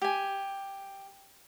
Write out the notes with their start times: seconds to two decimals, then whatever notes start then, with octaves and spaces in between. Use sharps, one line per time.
0.02 G4 G#5